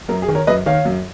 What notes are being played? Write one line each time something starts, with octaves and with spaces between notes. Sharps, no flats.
F#2 A#4
G#4
D#3
A#4 C#5
F#2 B4 D#5
D#3 C#5 F5
F#2